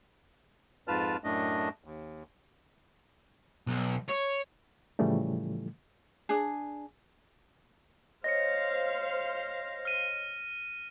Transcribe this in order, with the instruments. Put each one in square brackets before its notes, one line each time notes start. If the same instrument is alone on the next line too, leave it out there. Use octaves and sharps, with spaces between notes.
[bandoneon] F2 G#2 F4 B4 A5 F6
F#2 A2 A3 D4 D#5
D#2
[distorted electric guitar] B1
C#5
[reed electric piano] A2 C#3 E3 F3 G3 A3
[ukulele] D4 G#4
[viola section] C5 F5 [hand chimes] C#5 D#5 [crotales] A#6 C#7
[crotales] F6 D#7